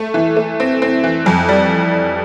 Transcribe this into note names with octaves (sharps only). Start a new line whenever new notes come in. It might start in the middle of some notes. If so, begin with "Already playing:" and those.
Already playing: A3
E3
A3
C4
C4
E3
F2
G3